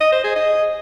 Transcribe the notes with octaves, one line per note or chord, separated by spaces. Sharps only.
D#5
C5
G#4
D#5